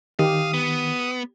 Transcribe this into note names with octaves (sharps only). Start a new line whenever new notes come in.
D#3 G4 F5 D#6
B3